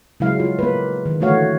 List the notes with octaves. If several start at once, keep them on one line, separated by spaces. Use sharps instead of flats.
C#3 F#3 G#3 E4 F5
F4
A#3 B4
D#3
D3 E3 A3 F#4 C#5 F5